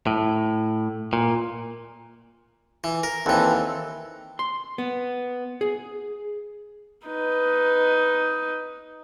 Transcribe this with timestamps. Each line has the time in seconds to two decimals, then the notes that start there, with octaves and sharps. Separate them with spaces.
0.07 A2
1.13 A#2
2.84 E3
3.03 A#4
3.26 D#2 E3 C4 A4 B4
4.39 C6
4.78 B3
5.61 G#4
7.07 D#4 B4